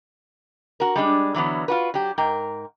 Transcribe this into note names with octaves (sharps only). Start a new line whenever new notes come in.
F#4 A#4
G3 G#3 D4
D3 E3 F#3 B3
F4 F#4 B4
F#3 G4
G#2 A#4 G5